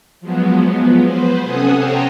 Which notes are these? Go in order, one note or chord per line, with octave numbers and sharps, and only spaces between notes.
F3 F#3 G#3 B3
B4 C5
C3 C#4 A4 F#5 G#5 D#6
C5 C#5 G5 A5 A#5